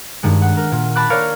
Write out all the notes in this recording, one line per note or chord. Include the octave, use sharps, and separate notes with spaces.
G2 D#3 G#3
F#5
A#4
A#2
A5 B5 D6 F#6
A#4 C#5 D5 F5